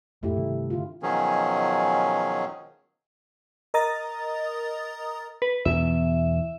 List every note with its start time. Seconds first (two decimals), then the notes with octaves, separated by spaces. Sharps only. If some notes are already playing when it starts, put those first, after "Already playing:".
0.23 F2 G#2 A3 E4 G4
0.36 G2 C3 D#3
0.70 D3 F4
1.03 B2 D#3 F3 F#3 C#4 G#4
3.74 A#4 D#5 A#5 D#6 A6
5.42 B4
5.65 E2 B2 E3 E5